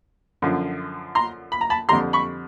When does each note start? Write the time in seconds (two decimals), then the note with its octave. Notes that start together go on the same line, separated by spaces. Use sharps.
0.42 F#2 D3 F3
1.15 A#5 C6
1.52 B5
1.61 A#5
1.70 A5 B5
1.89 F2 D3 G3 A#5 C6
2.13 B5 C#6